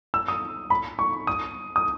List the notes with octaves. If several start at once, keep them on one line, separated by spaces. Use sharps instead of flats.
E6
D#6
B5
C#6
D#6
D#6